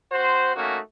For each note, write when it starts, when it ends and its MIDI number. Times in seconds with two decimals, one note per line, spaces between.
0.12 0.53 60
0.12 0.53 66
0.12 0.53 72
0.55 0.78 57
0.55 0.78 58
0.55 0.78 61
0.55 0.78 63
0.55 0.78 66